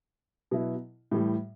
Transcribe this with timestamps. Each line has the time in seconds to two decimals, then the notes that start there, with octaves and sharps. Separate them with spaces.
0.51 B2 F#3 B3 E4
1.11 A2 E3 G3